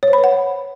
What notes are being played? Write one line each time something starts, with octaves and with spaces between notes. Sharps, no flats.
C#5
C5
B5
B4
F#5